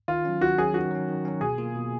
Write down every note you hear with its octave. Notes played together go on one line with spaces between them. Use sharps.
D#3 F4
F#3 C#4
D#3 F#4
F#3 C#4 G#4
D#3 F#4
F#3 C#4
D#3
F#3 C#4
B2 G#4
A#3 F4
B2